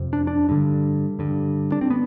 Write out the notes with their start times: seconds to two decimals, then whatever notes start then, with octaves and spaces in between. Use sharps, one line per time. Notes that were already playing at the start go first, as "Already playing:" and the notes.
Already playing: F2 C3
0.13 D4
0.27 D4
0.49 G2 D3
1.19 G2 D3
1.72 D4
1.81 C4
1.90 B3